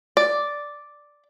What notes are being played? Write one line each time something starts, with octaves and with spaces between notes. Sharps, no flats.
D5